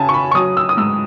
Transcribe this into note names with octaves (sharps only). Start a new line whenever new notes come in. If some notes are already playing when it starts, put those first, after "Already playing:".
Already playing: C#3 C#4 G#5 A5
C#6
B5
C#6
F#3 D#6
E6
D#6
G#2 E6